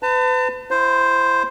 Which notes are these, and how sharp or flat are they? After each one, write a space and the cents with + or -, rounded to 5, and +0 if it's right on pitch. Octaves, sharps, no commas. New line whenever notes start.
B4 +35 A5 +35
E4 +30 C5 +0